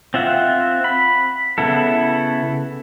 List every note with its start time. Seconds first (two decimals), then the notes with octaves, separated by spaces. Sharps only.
0.14 C4 F4 E5 F#5
0.84 B5
1.58 C#3 B3 E4 A4